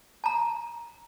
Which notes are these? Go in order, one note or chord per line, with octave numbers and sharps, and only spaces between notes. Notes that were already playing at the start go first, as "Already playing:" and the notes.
A5 A#5